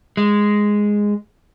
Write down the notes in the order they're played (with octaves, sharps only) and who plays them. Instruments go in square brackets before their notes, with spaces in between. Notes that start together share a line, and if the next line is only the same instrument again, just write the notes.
[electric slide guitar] G#3